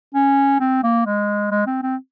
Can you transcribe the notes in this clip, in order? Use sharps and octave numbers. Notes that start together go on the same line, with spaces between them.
C#4
C4
A#3
G#3
G#3
C4
C4